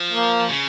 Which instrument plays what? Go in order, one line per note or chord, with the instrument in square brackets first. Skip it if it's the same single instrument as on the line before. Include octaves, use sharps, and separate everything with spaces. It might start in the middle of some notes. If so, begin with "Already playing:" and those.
Already playing: [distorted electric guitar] F3
[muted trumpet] A#3
[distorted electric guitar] C#3